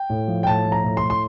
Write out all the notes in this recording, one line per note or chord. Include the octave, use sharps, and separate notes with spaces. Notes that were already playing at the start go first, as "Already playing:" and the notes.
Already playing: G5
A2
F3
G5
A2 A5
F3
A#5
A2
C6
A2
C6